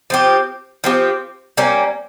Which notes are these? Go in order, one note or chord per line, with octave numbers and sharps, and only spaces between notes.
F3 C4 G4
F3 C4 G4
G3 A#3 C#4